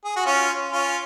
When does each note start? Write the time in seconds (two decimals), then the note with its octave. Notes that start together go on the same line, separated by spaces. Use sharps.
0.05 G#4
0.16 F#4
0.25 C#4 F4
0.72 C#4 F4